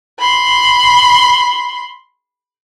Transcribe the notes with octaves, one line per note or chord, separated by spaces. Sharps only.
B5 C6